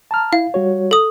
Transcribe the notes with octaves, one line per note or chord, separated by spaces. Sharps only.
A5 A#5 F6
E4 F5
G3 F#4 C#5
A4 D#6